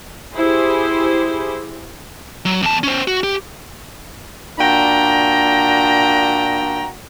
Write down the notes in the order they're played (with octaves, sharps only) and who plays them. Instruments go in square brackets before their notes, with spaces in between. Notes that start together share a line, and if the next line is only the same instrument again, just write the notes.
[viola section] E4 G4 G#4 C5
[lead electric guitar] F#3
E2 A5
C#4 C5
F#4
G4
[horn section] A#2 D4 F#4 G5 A#5